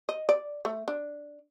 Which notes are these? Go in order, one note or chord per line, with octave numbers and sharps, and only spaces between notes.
D#5
D5
A3
D4